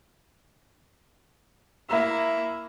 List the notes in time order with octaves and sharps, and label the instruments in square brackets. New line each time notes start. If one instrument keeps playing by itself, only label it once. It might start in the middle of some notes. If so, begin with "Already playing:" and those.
[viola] A#3 E4 [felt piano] E5 A#5 E6